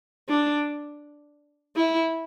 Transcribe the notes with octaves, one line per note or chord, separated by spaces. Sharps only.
D4
E4